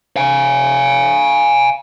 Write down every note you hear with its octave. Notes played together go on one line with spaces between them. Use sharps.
F5 G#5